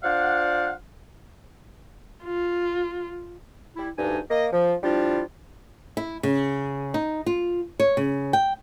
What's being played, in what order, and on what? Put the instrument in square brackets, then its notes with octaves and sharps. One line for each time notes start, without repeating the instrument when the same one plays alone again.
[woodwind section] D4 F4 C5 D5 F5 F#5
[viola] F4
[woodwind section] G3 E4
D2 G2 D4 D#4 G#5
A#3 D#5
F3
F3 G3 D4 E4 F4
[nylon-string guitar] E4
C#3
D#4
F4
C#5
C#3
G5